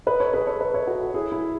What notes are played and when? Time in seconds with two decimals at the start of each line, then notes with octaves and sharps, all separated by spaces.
0.07 B4 D#5
0.20 A4 C#5
0.34 G#4 B4
0.46 A4 C#5
0.61 B4 D#5
0.74 C#5 E5
0.87 F#4 A4
1.01 F#4 A4
1.14 E4 G#4
1.32 E4 G#4